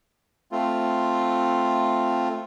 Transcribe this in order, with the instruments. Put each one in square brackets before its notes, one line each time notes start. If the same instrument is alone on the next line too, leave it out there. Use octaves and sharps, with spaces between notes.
[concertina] A3 C4 F4